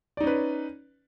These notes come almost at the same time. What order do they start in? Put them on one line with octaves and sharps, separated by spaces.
D5 D#4 C#4 B4